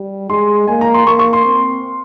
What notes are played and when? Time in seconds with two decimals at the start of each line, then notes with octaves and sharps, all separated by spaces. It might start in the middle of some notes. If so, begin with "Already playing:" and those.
Already playing: G3
0.29 G#3 C6
0.68 A#3 G#5
0.81 A#5
0.94 C6
1.07 A#3 C#6
1.19 C#6
1.33 C6
1.45 C4